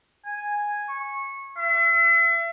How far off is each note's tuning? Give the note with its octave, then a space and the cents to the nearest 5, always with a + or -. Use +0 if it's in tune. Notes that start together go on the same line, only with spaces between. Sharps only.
G#5 -5
C#6 -20
E5 +40